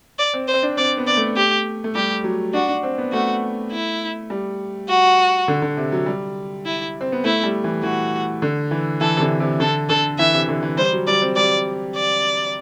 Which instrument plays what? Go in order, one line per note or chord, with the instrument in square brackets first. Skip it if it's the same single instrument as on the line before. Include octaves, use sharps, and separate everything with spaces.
[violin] D5
[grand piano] C4
[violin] C5
[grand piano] C4
D4
[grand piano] C4 [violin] D5
[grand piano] B3
[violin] D5
[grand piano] A3
[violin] G4
[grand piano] A3
[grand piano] G3 [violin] G4
[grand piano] F#3
[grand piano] D4 [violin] F#4
[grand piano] D4
C4
B3
[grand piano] A3 [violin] F#4
[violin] E4
[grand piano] G3
[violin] F#4
[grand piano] D3
D3
C3
F#3
G3
[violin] E4
[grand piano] C4
B3
[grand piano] A3 [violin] E4
[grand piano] G3
E3
[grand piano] E3 [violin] F#4
[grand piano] D3
E3
[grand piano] E3 [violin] A4
[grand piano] C3
D3
C3
[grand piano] D3 [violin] A4
[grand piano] D3 [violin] A4
[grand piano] E3 [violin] E5
[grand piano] C3
D3
E3
[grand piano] G3 [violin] C5
[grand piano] F#3
[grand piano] G3 [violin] D5
[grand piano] C4
[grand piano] G3 [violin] D5
[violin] D5